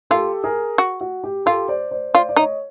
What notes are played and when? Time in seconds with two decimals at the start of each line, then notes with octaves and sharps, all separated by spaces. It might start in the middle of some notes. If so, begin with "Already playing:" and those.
0.11 F4 G4 A4
0.44 G#4 A#4
0.78 F#4
1.01 F#4
1.24 G4
1.46 F4 G4 A4
1.68 C5 D5
1.91 C5 D5
2.14 F4 C5 D5
2.29 D5
2.37 D#4 C#5 D#5